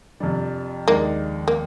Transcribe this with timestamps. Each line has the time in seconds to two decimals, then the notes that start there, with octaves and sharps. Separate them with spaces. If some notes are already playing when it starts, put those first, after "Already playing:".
0.20 F2 C3 G3 D4
0.88 D#2 D#3 G#3 A#3 D4
1.48 A#3